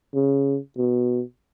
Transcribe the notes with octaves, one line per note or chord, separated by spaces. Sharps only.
C#3
B2